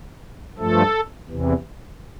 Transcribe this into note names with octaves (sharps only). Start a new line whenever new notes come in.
G2 F3 A3 A4
E2 C3 E3